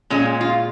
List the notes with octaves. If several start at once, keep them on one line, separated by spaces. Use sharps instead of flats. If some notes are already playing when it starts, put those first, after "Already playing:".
A#2 G#3 C#4
F4